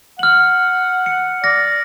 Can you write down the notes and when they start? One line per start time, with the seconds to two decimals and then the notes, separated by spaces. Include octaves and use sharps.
0.19 F#5 F6 F#7
1.06 C#7
1.43 D5 F6 A#6